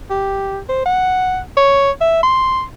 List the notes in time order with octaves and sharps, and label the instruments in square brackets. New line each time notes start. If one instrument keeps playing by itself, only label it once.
[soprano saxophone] G4
C5
F#5
C#5
E5
C6